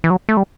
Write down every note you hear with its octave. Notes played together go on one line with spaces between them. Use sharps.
E3
F#3
A3
G3